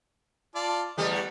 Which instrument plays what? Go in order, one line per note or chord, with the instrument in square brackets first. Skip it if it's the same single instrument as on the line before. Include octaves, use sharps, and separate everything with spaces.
[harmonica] F4 D5 A5
[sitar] E2 G3 A3 [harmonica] D#5
[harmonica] F#5